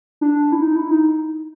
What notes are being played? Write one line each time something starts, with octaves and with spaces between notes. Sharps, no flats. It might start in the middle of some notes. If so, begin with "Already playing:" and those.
D4
E4
D#4
E4
D#4